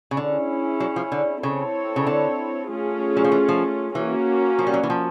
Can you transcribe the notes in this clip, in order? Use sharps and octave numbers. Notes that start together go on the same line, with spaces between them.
C#3
D3 C#4 E4 G#4
F#3
F3
D3
C#3 C4 E4 A4 C#5
C#3
D3
A3 C#4 F4 G#4
F#3
F3
E3
F3
E3 A#3 C#4 F#4
F3
G3
F#3
E3
F3